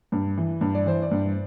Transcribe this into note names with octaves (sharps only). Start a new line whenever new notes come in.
G2
E3
G2
D5
E3 C5
D5
G2